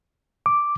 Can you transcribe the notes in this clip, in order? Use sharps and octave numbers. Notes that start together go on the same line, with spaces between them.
D6